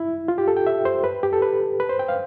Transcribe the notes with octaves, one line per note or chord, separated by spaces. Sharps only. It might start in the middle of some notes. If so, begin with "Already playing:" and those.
Already playing: E4
F4
G4
A4
G5
E5
C5
B4
G4
A4
B4
B4
C5
G5
F5